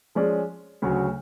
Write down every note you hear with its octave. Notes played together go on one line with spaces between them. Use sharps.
F3 G#3 C#4 G#4 D5
D2 C#3 F#3